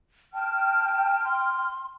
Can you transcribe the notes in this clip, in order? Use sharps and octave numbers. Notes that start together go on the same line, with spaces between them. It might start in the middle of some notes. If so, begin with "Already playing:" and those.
G5 A5 F6
C6